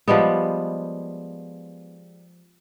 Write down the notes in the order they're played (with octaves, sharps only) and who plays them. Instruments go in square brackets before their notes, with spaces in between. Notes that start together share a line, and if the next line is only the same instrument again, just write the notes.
[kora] F3 G3 G#3 B3